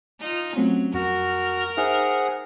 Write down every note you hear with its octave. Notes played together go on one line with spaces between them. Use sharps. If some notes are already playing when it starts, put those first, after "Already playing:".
D#4 F4
F#3 A3 C4 C#4
F2 F#4 A#4
D#4 G#4 C5 E5 F#5